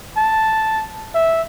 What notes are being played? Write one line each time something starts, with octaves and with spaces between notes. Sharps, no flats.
A5
E5